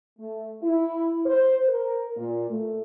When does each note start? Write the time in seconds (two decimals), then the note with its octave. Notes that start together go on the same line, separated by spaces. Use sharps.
0.19 A3
0.62 E4
1.26 C5
1.69 A#4
2.17 A#2
2.50 A3